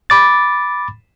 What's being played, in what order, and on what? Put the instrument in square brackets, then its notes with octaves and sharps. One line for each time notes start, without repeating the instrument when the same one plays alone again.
[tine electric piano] B5 D6 A6